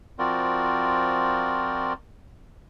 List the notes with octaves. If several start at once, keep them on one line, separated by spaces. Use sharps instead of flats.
F3 C4 F4 F#4 A#4 D5